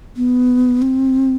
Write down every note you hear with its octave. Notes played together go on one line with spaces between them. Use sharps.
B3
C4